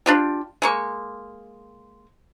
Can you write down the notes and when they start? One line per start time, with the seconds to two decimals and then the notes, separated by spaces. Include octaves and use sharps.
0.06 D4 F4 G4
0.62 G#3 A#3 C#6